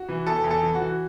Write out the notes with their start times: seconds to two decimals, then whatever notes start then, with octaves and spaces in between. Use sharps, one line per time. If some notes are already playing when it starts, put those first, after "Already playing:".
Already playing: F#4
0.09 E3
0.26 E2 A4
0.44 E2
0.51 A4
0.63 E3
0.75 F#4
0.80 E3